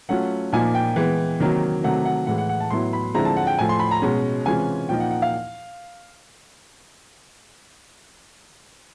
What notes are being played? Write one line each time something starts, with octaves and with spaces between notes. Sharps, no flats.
F#3 A3 C#4 F4 F#5
A#2 F3 A#3 D#4 G#5
G5
E3 G#3 B3
C3 D#3 F#3 A#3
C3 D#3 F#3 A3 F#5
F#5
A2 E3 G#3 F#5
F#5
F#5
A5
A2 F#3 B3 E4 C6
B5
D3 F3 G#3 C4 E4 A#5
A5
F#5
G5
A2 F3 A3 G#5
C6
B5
A#5
B2 G#3 C#4
C3 E3 G#3 C#4 F4 G#5
A#2 F3 A#3 D#4 G5
F#5
F#5
F5